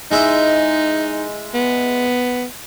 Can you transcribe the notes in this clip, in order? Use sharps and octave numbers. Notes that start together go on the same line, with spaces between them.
G#3 D#4 E4 E5
B3